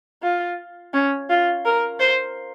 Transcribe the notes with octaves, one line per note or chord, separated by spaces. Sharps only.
F4
C#4
F4
A#4
C5